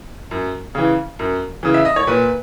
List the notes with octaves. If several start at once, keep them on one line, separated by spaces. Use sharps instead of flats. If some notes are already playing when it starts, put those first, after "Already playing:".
F#2
C#3 E3
F#2
C#3 E3
E5
D#5
C#5
A#2 B4